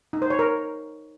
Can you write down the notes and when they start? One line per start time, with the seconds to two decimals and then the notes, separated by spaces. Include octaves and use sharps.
0.13 D#4
0.22 C5
0.30 C#5
0.39 A#4